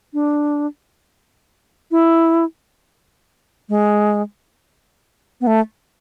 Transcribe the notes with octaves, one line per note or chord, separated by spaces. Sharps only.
D4
E4
G#3
B3
A3